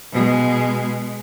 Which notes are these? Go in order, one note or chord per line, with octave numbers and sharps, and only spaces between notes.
B2 G#3